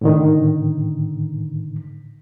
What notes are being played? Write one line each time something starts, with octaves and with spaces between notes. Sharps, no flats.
A2 D3 D#3